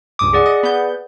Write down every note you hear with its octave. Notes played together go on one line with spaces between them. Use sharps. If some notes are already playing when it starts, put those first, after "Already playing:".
C#2 G2 D6 D#6
G#4 D5 F#5
D#5
B3 G6